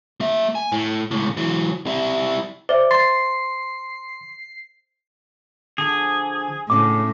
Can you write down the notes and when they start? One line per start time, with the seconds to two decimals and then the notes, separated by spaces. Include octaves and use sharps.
0.21 A#3 E5
0.55 G#5
0.72 A2
1.11 C#2 A2
1.37 E3 F#3
1.86 G3 E4
2.69 C5 D5 E5
2.91 C6 A6 C7
5.78 D3 F3 G#4
6.70 A2 C#3 C#4 D4 D6